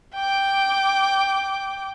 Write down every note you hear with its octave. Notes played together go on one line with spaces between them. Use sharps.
G5 D6